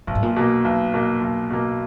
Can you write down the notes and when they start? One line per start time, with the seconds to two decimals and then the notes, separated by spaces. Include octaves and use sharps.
0.07 B1 A#2
0.15 G#2
0.23 A#2
0.36 B2 A#3
0.65 B1
0.94 B2 A#3
1.22 B1
1.50 B2 A#3